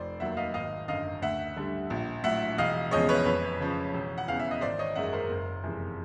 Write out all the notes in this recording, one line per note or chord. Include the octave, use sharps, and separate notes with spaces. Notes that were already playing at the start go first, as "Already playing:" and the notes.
Already playing: F1 C5 D5
D#2 D#3 F#3 E5 F#5
D#5 F5
G#1 D#5 F5
F#2 D3 D#5 F5
D2 E5 F#5
D3 G3
A#1
A2 F#3 E5 F#5
E1 D#5 F5
E2 C#3 F3 G#3 C#5 D#5
B4 C#5
F2 B4 C#5
C#3 F3
E1
F#5
E2 C#3 E3 F5
E5
D#5
G#1 C5 D5
C#5 D#5
F#2 D#3 G#3 E5 F#5
A#4 C5
F#1
F2 C3 E3 G#3